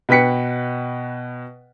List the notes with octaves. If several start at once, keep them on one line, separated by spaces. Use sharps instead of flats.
B2 B4 G5 B6 C#7